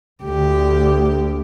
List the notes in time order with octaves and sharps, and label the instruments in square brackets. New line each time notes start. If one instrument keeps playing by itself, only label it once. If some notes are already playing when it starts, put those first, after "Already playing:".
[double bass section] D2 [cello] G4